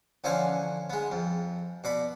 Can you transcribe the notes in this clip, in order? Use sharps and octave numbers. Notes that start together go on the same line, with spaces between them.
D3 E3 F3 C#4 C5 C#5
G#3 B3
F2
B2 D5 B5